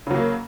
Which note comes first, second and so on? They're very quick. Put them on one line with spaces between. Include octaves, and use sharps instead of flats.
C#3 F#3 A#3